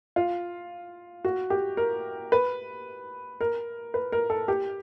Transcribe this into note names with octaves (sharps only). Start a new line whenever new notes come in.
F4
F#4
G4
A#4
B4
A#4
B4
A#4
A4
G4